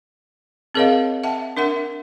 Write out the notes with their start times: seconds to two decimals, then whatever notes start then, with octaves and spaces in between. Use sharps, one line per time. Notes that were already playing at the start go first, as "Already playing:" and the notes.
0.74 C4 G#4 A#4 C#5 D#5 F5
1.24 E5 F#5 A5
1.57 D4 A#4 E5 F#5